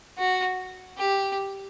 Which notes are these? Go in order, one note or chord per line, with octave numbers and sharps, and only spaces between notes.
F#4
G4